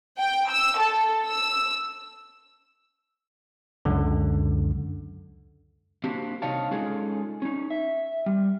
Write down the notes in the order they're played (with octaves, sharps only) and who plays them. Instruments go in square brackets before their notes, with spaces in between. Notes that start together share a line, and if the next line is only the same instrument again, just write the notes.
[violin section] G5
E6
A4
E6
[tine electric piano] C#2 F#2 D3
[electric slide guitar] A#3 C4 D4 F#4 G4
C3 D#4 C#5 F5 A5
G#3 C#4 D#4 F4 G#4 A4
C#4 D#4
E5
G3